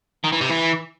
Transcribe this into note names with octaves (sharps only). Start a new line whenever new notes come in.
D#3
E3
C3
E3